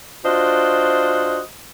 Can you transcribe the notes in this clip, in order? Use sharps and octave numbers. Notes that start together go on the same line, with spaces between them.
D4 F4 F#4 C5 D#5